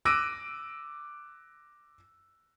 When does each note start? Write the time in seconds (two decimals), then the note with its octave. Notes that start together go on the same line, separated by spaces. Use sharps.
0.05 D6 E6 F#6 A#6 D7 D#7